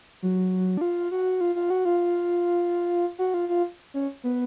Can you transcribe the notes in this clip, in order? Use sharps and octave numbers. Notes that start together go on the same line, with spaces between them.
F#3
D4
F4
F#4
F4
F4
F#4
F4
F#4
F4
F4
C#4
B3